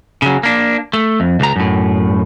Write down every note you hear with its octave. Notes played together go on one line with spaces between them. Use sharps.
C#3 F#3
A#3 D4
A3
F2
C#2 A#5
F#2 A2